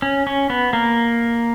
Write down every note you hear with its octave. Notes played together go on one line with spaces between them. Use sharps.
C#4
C#4
B3
A#3